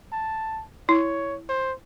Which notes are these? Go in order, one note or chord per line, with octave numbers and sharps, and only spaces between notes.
A5
E4 C#5
C5